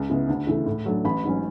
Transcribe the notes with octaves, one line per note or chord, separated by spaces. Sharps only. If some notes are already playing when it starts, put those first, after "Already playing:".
Already playing: C#2
C#3 G#3 B3 E4
D2
C#3 E3 A3 E4
A2
F#3 A3 D4
A1 B5
G#2 F#3 C#4